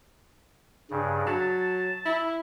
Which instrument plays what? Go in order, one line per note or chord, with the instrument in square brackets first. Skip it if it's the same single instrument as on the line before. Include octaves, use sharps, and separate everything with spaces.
[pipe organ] G2 C#3
[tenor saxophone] F#3 [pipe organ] A5
[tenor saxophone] E4